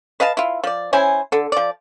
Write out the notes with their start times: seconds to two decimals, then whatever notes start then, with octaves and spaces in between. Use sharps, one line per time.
0.20 B4 D#5 F5 A5
0.37 E4 F4
0.64 F3 D5
0.93 C#4 E4 C5 G#5
1.32 D3 A4
1.52 F3 D5